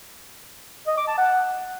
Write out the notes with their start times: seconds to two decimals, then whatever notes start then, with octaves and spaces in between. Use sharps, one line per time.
0.87 D#5
0.97 D6
1.08 A5
1.18 F#5